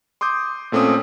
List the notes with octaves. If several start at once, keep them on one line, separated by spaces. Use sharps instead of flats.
C6 D6 D#6 G6
A#2 A3 C4 C#4 D#6